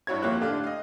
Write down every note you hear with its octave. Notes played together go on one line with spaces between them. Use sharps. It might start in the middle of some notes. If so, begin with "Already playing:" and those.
G2 E4 F#4 C#5 G#6
F1 F3 A#3 G4 C#5 F#6
A2 D3 D4 G4 F5
D#5 F5